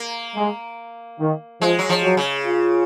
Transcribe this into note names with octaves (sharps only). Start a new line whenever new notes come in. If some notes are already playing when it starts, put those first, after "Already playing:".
Already playing: A#3
G#3
D#3
F3 G#3
F#3
F3
F#3
C#3
F4